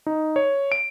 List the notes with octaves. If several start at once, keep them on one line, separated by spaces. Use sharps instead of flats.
D#4
C#5
D7